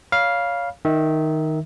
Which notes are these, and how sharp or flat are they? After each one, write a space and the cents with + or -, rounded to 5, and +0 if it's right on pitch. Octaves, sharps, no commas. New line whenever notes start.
C#5 +25 F5 +0 B5 -30
D#3 +0 E5 -20